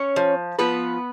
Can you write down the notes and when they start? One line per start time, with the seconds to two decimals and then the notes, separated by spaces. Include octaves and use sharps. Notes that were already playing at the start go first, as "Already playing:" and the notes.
Already playing: C#4 C#5
0.16 F3
0.59 F3 B3 B4